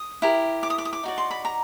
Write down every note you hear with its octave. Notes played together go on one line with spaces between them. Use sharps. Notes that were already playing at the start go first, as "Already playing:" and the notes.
Already playing: D#6
E4 G4 A#4
D6
D#6
D6
D#6
D6
D#4 F#4 D5
C6
B5
A#5